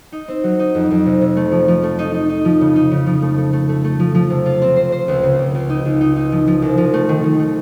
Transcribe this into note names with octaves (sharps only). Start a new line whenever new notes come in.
D#4
C4
F#3
D#4
F2
F2
C3
C3
A3
F3
F3
A3
D#4
D#4
D#4
F3
C#3
D#4
C#3
F3
A3
A3
A3
A3
A3
F3
F3
C3
F4
C4
C5
C5
C#2
C#3
C#2
C#2
D#4
C#2
D#4
D#4
F3
F3
C2
F3
A3
D#3
D#3
A3